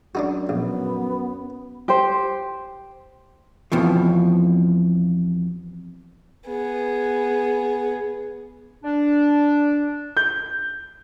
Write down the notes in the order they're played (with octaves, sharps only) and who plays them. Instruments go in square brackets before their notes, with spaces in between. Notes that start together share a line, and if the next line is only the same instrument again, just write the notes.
[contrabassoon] F#2 [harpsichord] D4 D#4 F#4
[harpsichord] A#1 [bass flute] B3
[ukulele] G4 C5
[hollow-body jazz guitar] F2 B2 E3 F3
[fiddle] B3 G#4
[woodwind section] D4
[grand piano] G6